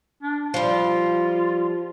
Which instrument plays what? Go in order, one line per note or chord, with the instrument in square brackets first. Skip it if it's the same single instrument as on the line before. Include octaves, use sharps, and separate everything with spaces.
[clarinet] D4
[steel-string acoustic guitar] F3 G3 [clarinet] F4